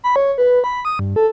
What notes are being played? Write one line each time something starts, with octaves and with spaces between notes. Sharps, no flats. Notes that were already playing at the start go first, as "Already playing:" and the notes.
B5
C#5
B4
B5
D#6
G2
A4